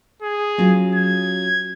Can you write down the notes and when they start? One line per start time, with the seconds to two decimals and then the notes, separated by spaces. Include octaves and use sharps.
0.23 G#4
0.58 F#3 C#4 F4
0.95 G#6